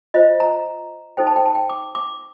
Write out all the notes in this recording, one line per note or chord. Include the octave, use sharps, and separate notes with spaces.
F4 C5 D#5
A#5
D#4 A4 C5 G5
A5
G5
A5
G5
D6
D6